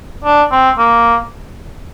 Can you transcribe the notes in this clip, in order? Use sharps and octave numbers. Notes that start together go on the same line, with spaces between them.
D4
C4
A#3